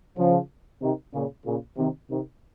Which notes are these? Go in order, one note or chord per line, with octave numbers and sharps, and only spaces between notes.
C#3 F3
C3 D#3
A#2 C#3
A#2 C#3
C3 D#3
C3 D#3